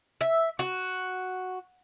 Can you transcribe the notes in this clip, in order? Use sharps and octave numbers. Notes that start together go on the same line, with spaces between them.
E5
F#4